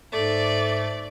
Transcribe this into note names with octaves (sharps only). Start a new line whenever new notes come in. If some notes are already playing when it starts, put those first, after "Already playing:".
G#2 A3 A4 D5